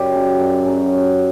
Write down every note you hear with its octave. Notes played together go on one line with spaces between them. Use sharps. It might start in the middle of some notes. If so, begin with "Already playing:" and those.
Already playing: F#2 G4
C#3 F#3
F#2
C#3 F#3